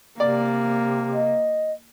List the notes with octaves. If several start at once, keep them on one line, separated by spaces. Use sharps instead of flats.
C3 A#3 D5
D#5